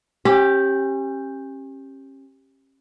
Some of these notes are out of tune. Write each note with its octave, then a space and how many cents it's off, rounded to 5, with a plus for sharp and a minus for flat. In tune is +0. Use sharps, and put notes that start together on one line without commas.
C#4 -35 G4 +0